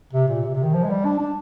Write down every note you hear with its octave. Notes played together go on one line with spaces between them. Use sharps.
C3
A#2
C3
C3
D#3
F3
G#3
G3
D4
D4